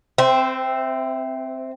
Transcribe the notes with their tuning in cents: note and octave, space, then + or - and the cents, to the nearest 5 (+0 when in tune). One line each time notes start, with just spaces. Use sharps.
C4 +0 C5 -35 E5 +0